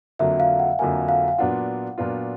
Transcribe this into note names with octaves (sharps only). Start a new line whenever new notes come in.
F2 D3 F#3 A#3 E5
F5
F#5
F2 D3 F#3 A#3 G#5
F5
F5
A#2 F#3 B3 D4 F4 F#5
A#2 F#3 B3 D4 F4